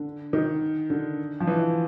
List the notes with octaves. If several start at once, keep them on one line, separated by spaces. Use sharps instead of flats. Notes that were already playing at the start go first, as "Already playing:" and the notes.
Already playing: D3
D#3
D3
F3
E3